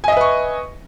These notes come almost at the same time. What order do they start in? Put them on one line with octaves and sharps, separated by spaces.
G#5 D#5 E5 B4 C#6